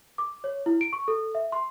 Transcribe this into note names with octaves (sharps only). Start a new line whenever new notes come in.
D6
C#5
E4
D7
C#6
A4
E5
C6